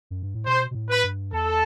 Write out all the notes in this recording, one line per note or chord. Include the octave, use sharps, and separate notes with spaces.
F#2
G2
A2
B2 C5
B2
A2
B4
G2
E2 A4